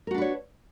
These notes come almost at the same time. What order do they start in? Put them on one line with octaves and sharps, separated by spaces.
A#4 F#4 D4 B4 C#5